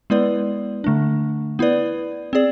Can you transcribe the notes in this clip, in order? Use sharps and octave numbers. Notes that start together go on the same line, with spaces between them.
G#3 B3 E4 B4 D5
D3 A3 D4
B3 E4 B4 D5
C4 G#4 D5